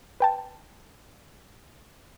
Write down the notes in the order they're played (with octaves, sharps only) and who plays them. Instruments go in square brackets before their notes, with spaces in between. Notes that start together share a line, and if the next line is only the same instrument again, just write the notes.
[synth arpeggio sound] B4 G5 A5